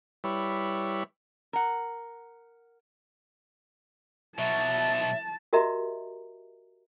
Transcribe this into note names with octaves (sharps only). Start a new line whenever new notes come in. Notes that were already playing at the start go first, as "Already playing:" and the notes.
G3 E4 B4 C#5
A#4 F#5
B2 F#3 E5 A5
F#4 G4 A#4 D#5 E5 A#5